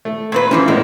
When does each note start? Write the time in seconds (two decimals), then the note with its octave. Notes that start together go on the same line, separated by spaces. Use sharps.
0.05 A3
0.32 A#2 C4 B4
0.51 F#2 E3 F3 C#4
0.68 A2 G#3 B3 C4 A#4